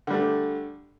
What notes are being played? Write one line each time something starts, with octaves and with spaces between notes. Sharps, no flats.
D3 G3 A3